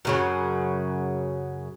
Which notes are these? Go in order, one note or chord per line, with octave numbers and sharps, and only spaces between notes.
F#2 C#3 F#3